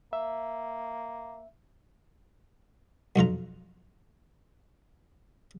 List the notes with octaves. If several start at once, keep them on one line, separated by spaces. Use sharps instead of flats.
A#3 E5
B1 F2 F4 A#5